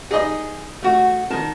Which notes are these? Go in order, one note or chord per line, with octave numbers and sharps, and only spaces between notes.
D#4 G#4 D#5
A3 F#4
D#3 A5